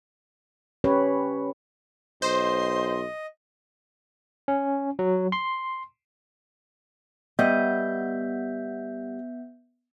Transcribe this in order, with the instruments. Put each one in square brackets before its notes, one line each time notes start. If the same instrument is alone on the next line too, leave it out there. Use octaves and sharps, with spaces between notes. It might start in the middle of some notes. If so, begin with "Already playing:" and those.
[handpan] C#4 G4 B4 C#5
[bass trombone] B1 [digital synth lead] C5 [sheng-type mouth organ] D#5 [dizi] C6
[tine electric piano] C#4
F#3
C6
[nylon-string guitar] G3 D#5 [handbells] B3 E5 G6